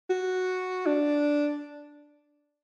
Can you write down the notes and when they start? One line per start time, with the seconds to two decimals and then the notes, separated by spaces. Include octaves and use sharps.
0.10 F#4
0.86 D4